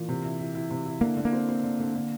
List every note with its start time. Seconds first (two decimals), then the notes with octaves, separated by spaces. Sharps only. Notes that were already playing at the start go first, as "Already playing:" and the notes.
Already playing: A#2 E3
0.08 C3
0.24 E4
0.39 E4
0.55 E4
0.71 C3
0.86 E4
1.01 D3 A#3
1.17 D3
1.25 A#3
1.33 C4
1.49 C4
1.64 D3
1.80 D3
1.95 D3